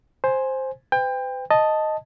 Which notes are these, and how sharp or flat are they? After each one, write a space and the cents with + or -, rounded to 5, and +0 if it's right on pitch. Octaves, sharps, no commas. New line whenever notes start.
C5 +5 G#5 +0
B4 +45 G5 +25
D#5 +0 A5 +0